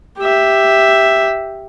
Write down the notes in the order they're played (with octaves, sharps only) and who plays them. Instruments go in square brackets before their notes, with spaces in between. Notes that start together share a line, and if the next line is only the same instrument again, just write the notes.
[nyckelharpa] G4 E5